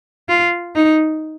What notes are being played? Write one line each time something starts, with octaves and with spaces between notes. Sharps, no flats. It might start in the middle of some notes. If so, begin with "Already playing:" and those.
F4
D#4